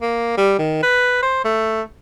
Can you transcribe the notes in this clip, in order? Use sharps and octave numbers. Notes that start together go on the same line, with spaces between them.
A#3
G3
D#3
B4
C5
A3